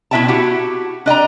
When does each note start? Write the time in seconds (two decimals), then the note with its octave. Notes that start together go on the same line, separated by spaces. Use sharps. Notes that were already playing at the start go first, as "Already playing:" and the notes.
0.11 B2 E4 F4 E5 G5 A5
0.28 E4 F#4 G4
1.06 D4 D#5 G5 A#5